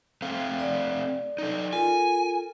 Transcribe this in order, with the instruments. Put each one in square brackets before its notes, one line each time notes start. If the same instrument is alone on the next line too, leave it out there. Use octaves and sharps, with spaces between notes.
[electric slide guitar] A3 C4 F5
[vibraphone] D5
[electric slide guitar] D#4 A4
[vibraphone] F4 A4 A#4 [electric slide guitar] G#5